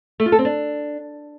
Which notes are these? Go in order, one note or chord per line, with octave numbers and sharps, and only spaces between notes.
A3
F4
A4
C4
D4